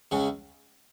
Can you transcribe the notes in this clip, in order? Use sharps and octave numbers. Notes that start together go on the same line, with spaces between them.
C#2 C#3